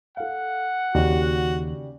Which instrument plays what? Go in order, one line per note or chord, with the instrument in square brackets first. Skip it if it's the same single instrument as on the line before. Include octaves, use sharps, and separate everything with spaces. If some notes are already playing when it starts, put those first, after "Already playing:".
[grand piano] A4 F5 [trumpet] F#5
[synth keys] D#2 [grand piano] C#3 G4 D5 [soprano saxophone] F#4